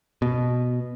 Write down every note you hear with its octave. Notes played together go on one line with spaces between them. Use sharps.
B2